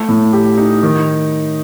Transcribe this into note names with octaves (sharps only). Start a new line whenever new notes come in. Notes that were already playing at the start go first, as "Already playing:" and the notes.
Already playing: A3
A2
G4
D#4
D#3